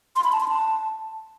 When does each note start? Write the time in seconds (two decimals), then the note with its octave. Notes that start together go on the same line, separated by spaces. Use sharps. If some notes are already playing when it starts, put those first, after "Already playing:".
0.16 C6
0.24 B5
0.32 A5
0.40 C6
0.48 A5